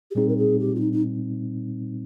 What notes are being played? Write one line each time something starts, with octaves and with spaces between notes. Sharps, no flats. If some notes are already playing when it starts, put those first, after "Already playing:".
G4
A#2 G3 C4 D#4 G#4
A#4
G#4
G4
F4
D#4
D#4